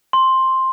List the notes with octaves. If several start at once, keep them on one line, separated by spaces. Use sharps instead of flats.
C6